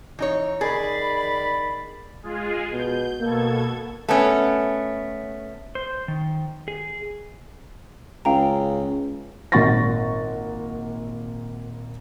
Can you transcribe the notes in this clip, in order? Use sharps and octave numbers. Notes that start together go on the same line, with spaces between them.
E3 D#4 C#5
D#3 G#4 D5 B5
G#3 F4 G#4
B2 G6
B2 A#3 A4 G#6
A3 B3 C#4
C5
D#3
G#4
C#2 F5 G5 A#5
G#1 A#2 F#5 C#6 A6 A#6